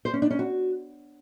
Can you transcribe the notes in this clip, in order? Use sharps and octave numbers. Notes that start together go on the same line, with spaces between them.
C5
C#4
D4
C#4
F#4